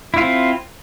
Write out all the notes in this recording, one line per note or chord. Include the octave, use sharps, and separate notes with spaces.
C4 E4 F4